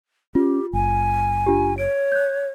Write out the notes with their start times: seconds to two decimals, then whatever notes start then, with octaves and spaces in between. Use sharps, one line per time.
0.35 C#4 F4 G4
0.73 F#1 G#5
1.46 D4 F4 G4
1.78 C#5 D7
2.12 F#6 G6